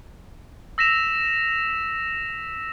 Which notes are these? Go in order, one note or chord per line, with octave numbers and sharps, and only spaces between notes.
E6 A#6 B6 E7 F7